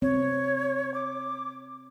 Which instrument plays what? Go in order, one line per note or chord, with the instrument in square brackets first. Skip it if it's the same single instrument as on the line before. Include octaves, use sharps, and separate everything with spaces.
[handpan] C4 [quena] C#5
[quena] D6